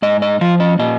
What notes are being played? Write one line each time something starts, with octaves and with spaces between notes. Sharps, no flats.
G#2 D#5
D#5
F3 F5
D#5
A#2 D#5